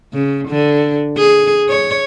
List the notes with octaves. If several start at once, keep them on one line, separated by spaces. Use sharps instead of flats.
C#3
D3
G#4
C#5